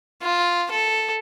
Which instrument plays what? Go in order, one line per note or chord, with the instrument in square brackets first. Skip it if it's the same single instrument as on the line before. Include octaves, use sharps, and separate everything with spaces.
[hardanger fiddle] F4
A4